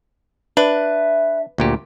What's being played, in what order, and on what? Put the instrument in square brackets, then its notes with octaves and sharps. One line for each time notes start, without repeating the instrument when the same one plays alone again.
[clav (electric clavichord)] D4 [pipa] B4 [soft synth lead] E5
[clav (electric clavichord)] D2 A#2 G4